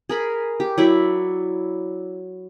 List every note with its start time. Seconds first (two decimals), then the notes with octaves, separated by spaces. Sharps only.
0.09 G#4 A#4 B5
0.60 G4
0.78 F#3 E4 D5